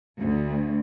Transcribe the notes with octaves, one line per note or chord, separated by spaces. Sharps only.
D2